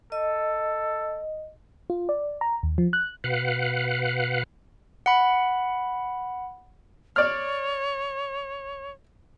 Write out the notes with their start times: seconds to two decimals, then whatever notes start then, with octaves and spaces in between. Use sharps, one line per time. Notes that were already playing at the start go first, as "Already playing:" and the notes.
0.12 A4 D#5
1.90 F4
2.09 D5
2.41 A#5
2.63 D#2
2.78 F3
2.93 F#6
3.24 B2 B4 F5 F#5
5.06 F#5 B5
7.16 C#5 D5 F6